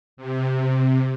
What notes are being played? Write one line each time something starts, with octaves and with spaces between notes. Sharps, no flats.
C3